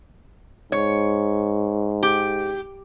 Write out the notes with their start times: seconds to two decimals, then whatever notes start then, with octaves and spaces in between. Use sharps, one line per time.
0.72 G#2 C#5
2.03 G4